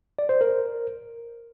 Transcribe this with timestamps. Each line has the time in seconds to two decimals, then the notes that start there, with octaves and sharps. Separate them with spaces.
0.19 D5
0.29 C5
0.41 A#4